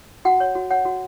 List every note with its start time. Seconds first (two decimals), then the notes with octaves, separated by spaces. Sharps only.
0.25 F#4 F#5
0.40 C#5
0.55 F#4
0.71 C#5 F#5
0.85 F#4